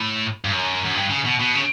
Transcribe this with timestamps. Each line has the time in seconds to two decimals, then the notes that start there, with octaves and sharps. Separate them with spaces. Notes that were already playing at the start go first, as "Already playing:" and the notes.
Already playing: A2
0.45 G2
0.52 F#2
0.85 F#2
0.96 G2
1.10 C#3
1.25 B2
1.39 B2
1.55 C#3